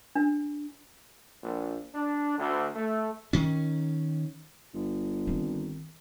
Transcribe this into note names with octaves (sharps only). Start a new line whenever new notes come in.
D4
A#1
D4
D2
A3
D#3 C#4
G1
D#3 C4